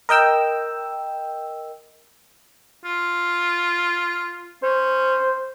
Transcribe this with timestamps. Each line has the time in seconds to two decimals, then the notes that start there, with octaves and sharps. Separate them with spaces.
0.09 A#4 D#5 G5 E6
2.85 F4
4.63 C#4 C5